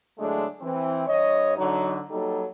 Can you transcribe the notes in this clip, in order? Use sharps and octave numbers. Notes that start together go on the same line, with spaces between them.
A2 D3 F#3 G#3 A3 D4
E3 C4
G2 C#5 D#5
D3 F#3 D#4
F#3 G3 A#3 D#4 A4